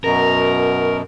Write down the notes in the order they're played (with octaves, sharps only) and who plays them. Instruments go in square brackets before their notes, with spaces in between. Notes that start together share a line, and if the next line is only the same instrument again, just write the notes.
[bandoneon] F#2 B2 [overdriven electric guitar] A#4